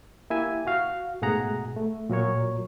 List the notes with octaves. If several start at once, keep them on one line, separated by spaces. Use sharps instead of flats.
A#3 E4 G4 E5 G#5
F#4 F5
G#2 B2 A3 G#4 F#5 A#5
A3
A#2 F#3 A#4 C#5